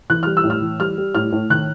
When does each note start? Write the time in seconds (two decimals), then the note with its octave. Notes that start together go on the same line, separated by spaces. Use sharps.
0.10 E3 F#6
0.23 G3 F6
0.37 E6
0.44 A2
0.50 F6
0.62 E3
0.80 G3 F6
0.98 G3
1.15 A2 F6
1.33 A2
1.50 D#3 F#6